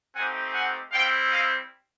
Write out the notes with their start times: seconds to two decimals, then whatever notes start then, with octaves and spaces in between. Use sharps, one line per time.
0.14 A3 C4 D#4 G4 F#5 G#5
0.53 F#5 G#5
0.91 G3 C4 E4 F5 G5
1.30 D#5 F5